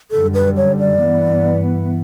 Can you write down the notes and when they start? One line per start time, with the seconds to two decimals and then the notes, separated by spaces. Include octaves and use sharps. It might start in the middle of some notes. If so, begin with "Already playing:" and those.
0.11 F#2 D3 G3 A4
0.34 B4
0.57 C#5
0.79 D5
1.01 G2 E3 B3